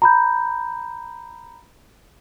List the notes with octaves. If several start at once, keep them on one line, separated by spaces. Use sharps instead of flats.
A#5 B5 G6